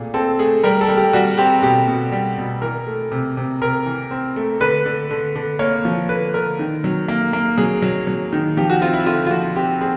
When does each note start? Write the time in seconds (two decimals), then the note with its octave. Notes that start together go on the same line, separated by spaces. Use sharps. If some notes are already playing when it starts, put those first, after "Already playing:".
Already playing: A#2 A3 G#4
0.14 C4 A4
0.39 A3 G#4
0.64 G3 A#4
0.81 A4
0.88 G3
0.97 G4
1.13 G3 F#4
1.38 C4 G4
1.63 B2 G4
1.88 B2
2.12 G3
2.38 B2
2.62 E3 A#4
2.87 A3
3.12 C3
3.37 C3
3.61 C3 A#4
3.86 E3
4.11 C4
4.36 A3
4.60 D3 B4
4.86 D3
5.10 D3
5.35 D3
5.59 A#3 C#5
5.85 F3
6.09 D3 B4
6.33 D3 A#4
6.59 D#3
6.84 F#3
7.08 A#3
7.33 A#3
7.58 F#3 G#4
7.82 F#3
8.07 F#3
8.33 D#3
8.57 F3 G4
8.70 F#4
8.81 C4 F4
8.94 E4
9.06 D3 F4
9.27 F4
9.31 F3 F#4
9.56 C4 G4
9.81 C4 G#4